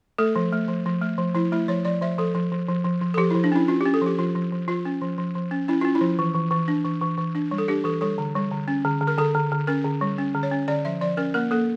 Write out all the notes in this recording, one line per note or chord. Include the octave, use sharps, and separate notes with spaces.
A3 A4
F3
A3
F3
F3
A3
F3
F3 E4
A3 E4
F3 C#5
F3 D5
F3 E5
F3 A4
F3
F3
F3
F3
F3
A4
F3 G4
E4
F3
D4
C#4 E4
C#4 F4
G4
C#4
A4
F3 G4
F3 F4
F3
F3
F3 F4
C#4
F3
F3
F3
C#4
C#4 E4
C#4 F4
E4
F3
E3
E3
E3
D4
E3
E3
E3
D4
G3
A4
D4 G4
E3 A4
G3 A4
D3
G3
D3
C#4
D3
D3
A#4
D3 A4
D3
D3
C#4 A#4
D3
G3
C#4
D3
C#5
C#4
D3 D5
F3 E5
F3 D5
C#4 A#4
A#3 A#4
A#3 A4